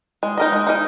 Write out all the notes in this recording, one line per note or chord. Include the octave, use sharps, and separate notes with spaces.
G#3
D#4 A#4 D#5
G#3
D#4 A#4 D#5